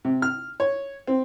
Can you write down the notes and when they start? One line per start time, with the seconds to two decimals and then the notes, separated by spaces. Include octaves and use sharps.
0.05 C3
0.22 F6
0.60 C#5
1.07 C4